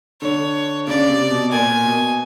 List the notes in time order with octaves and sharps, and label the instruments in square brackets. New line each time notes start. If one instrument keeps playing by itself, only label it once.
[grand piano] D3 [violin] C#5
[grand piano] C#3 [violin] D5
[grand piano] C3
B2
[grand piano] A#2 [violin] G#5
[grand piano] B2